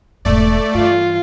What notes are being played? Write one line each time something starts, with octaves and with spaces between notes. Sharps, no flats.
E1 G#2 A3 D5
G2 E3 F4